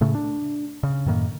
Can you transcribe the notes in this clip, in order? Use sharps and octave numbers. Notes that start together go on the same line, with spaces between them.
A2 C#3 A3
D4
C#3
F#2 A2 D#3 A#3